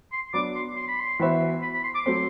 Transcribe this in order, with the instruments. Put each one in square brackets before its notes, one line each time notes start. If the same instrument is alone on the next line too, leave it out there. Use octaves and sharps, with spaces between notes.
[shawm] C6
[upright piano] F#3 B3 D4 [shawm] D6
[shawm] C6
C6
B5
C6
[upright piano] E3 B3 F#4 C5 E5
[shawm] B5
B5
C6
D6
[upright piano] F#3 A3 C4 [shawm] C6